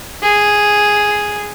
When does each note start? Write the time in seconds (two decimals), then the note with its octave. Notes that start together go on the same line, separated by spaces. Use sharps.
0.23 G#4